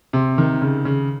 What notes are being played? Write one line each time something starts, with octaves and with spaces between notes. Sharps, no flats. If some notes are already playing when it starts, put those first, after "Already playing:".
C3
D#3
C#3
C#3